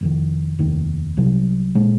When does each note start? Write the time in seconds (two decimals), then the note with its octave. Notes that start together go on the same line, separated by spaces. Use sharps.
0.01 F1 F2 D#3
0.59 F1 D#2 D#3
1.17 C2 C3 F#3
1.75 A#2 G#3